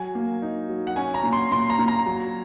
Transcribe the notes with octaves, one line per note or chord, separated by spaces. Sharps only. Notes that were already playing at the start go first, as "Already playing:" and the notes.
Already playing: F#3 G#5
A#3
D#4
F#3
F#5
C#4 G#5
A#5
A#2
C6
A#2 C6
A#5
A#2
A#5
F#3